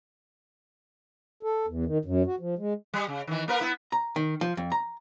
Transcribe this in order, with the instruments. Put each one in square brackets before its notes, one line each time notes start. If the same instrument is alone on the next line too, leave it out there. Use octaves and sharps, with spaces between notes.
[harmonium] A4
E2
D#3
F#2
F#4
F3
G#3
[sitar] G3
C#3
D#3 E3
A#3 A#4 B4
B3 E4
[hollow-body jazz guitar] A#5
D#3
F3
F2
A#5